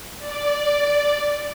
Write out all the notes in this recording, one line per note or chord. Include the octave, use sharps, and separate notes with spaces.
D5